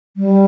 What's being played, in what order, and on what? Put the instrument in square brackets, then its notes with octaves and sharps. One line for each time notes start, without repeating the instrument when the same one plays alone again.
[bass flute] G3